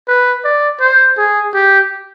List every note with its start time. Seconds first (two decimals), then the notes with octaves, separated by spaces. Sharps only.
0.08 B4
0.45 D5
0.81 C5
1.18 G#4
1.54 G4